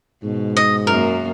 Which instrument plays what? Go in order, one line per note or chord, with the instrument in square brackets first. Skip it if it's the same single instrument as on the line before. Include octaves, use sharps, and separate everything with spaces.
[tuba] G#2 [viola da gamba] B2
[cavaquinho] D#5
[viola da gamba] F#2 A#3 [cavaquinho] A#4